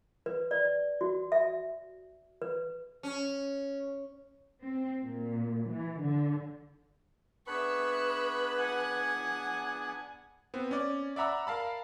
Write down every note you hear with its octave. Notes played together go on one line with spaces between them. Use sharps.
B4
D5
F#4
E5
B4
C#4
C4
A#2
E3
D3
B3 D4 G#4 B4 E5 C#6
F#5 G#5
B3 C4
C#4 D5
D5 E5 F#5 A#5 B5 E6
A#4 F5 A5 B5